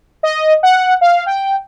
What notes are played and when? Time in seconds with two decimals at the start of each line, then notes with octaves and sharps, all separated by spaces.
0.23 D#5
0.63 F#5
1.01 F5
1.26 G5